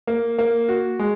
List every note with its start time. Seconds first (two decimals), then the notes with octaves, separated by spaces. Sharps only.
0.07 A#3
0.38 A#3
0.69 F#4
0.99 G#3